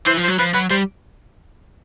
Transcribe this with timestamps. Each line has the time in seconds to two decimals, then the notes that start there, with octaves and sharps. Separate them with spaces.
0.06 E3 C5
0.17 F3
0.23 C5
0.28 F#3
0.38 F3 B4
0.54 F#3 B4
0.70 G3 C5